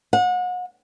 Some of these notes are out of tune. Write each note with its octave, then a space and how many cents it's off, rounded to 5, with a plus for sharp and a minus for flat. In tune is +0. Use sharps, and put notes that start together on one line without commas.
F#5 -35